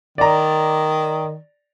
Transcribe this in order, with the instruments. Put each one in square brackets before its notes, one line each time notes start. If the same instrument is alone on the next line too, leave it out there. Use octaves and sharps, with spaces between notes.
[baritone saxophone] D#3 [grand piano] D5 A#5